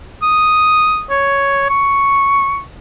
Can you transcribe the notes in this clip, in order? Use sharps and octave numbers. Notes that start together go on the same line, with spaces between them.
D#6
C#5
C#6